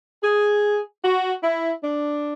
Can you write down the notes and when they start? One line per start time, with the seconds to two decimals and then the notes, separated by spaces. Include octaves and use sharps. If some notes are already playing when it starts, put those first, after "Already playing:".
0.23 G#4
1.04 F#4
1.44 E4
1.84 D4